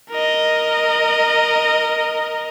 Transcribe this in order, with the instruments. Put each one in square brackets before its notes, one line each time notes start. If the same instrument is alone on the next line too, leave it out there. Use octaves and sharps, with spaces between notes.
[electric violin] A#4 D#5